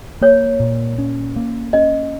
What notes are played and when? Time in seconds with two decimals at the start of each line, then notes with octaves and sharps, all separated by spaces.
0.21 A#3 C#5
0.60 A#2
0.98 C#4
1.36 A#3
1.73 C#4 D#5